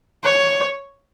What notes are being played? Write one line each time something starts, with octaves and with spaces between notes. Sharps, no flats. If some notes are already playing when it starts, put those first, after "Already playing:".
C#5